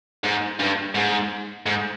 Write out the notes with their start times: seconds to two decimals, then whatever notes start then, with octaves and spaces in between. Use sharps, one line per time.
0.24 G#2
0.59 G2
0.95 G#2
1.66 G#2